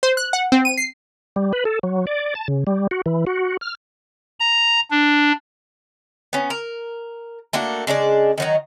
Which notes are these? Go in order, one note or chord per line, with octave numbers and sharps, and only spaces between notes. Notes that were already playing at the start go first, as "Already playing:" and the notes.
C5
F#6
F#5
C4
D#7
C7
G3
B4
A4
F#3
D5
A5
C#3
G3
F#4
E3
F#4
F6
A#5
D4
B3 C#4
A#4
A3 A#3 D4 F#4
C#3 G#3 D4 D5
D#3 F#3 D#4